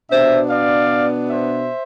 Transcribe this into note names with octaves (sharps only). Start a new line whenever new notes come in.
B2 B3 D4 C5 E5
D5 F5
C5 E5